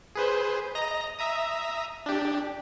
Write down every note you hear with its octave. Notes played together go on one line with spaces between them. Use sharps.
G#4 B4 C5
D#5 A#5 A#6
E5 A#5 D#6
D4 G4